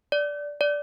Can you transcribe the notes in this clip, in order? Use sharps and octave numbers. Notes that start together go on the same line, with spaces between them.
D5
D5